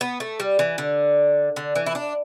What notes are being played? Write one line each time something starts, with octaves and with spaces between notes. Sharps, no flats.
B3
A3
G3
E3
D3
D3
E3
E4
D4